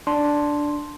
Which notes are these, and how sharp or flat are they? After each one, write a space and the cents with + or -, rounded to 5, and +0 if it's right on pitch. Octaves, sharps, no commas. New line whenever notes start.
D4 +0 C6 +0